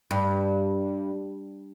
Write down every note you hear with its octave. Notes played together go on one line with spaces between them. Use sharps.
G2